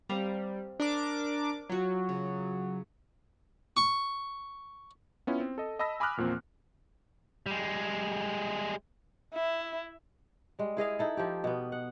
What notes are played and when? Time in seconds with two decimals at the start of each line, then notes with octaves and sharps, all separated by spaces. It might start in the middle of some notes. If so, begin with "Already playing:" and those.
0.09 G3 C4 F5 A#5
0.80 D4 A#4 D6
1.69 F#3 F4 F#4
2.09 C#3
3.77 C#6
5.27 B3 C#4 E4 F4
5.40 C4
5.58 A4 D#5
5.79 D#5 A5 B5 E6 A#6 B6
6.00 G#5 B5 D6 D#6 F6 F#6
6.17 E2 A#2 F3 A#3 C4
7.46 G3 G#3
9.34 E4
10.59 G3 G#3
10.77 E4 G#4 D#5 F5
10.99 D#4 E4 A4
11.17 F3 G4
11.44 B2 B3
11.72 F#5